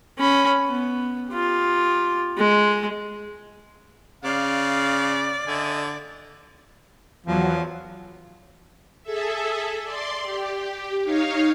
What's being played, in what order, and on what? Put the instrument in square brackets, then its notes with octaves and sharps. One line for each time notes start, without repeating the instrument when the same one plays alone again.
[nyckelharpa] C#4 B5
B3
F4 G4
G#3
[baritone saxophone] C#3 [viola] D5 [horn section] F5
[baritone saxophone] D3 [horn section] D#5 E5 G#5
[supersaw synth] E2 F#3 [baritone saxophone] F3
[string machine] G#4 A4 E5
D5 C6
G4
D#4 C#5 F5